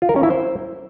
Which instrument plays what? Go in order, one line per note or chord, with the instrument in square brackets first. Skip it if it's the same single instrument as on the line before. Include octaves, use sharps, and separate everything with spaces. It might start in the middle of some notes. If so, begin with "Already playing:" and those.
[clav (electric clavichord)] F4
A#4
C#4
E4
C5